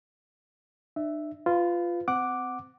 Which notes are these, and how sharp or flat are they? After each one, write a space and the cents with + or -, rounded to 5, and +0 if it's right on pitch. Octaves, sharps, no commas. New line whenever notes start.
D4 +45 E5 +0
F4 -5 B4 +25
C4 -30 F#5 +0 D6 +0